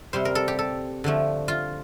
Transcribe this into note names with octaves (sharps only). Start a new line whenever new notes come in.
C3 G3 C5
A#4
A4
G4
A4
D3 F3 A3
F4